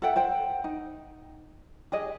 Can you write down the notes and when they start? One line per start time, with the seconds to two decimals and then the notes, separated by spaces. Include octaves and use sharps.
0.02 A4 E5 F#5 G5
0.16 C5 F#5 G5
0.64 D#4
1.92 G4 G#4 D#5